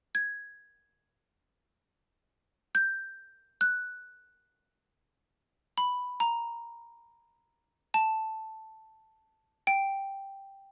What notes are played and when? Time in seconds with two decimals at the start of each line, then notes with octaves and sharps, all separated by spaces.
0.15 G#6
2.75 G6
3.61 F#6
5.78 B5
6.20 A#5
7.94 A5
9.67 G5